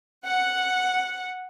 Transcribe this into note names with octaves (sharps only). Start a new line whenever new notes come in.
F#5